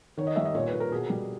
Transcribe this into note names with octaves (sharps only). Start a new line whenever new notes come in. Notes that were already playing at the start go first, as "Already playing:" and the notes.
D#3 C#5
D#5
G3 E5
D#5
A#2 C#5
B4
A#2
A#4
B2 G#4
G3